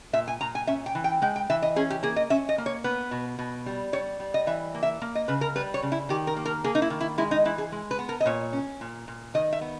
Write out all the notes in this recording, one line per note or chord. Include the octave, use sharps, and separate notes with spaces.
A#2 E5
G#5
A#2 A#5
G#5
C#4 E5
G5
E3
G5
G#3 G5
G5
E3 E5
D#5
C#4 G#4
G4
A#3 G#4
D#5
C#4 E5
D#5
A#3
C#5
B3 B4
B2
B2
G3
G3 C#5
G3
D#5
E3 E5
A#3
E5
A#3
D#5
C#3 B4
A#4
G3 B4
C#5
C#3
E4
D#3 G4
A#4
A#3
A#4
A#3 G#4
D#4
E4
D#3
E4
G#3 E4
D#4
E3 E4
G#4
G#3
B4
B3
A#4
D#5
A#2 C#5
C#4
A#2
A#2
D#3 D#5
E5
B3